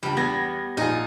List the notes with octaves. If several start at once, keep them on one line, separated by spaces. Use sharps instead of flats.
C#2 G2 G3 B5
E2 B3 G#6 A#6
A#1 D#4 F4 G#5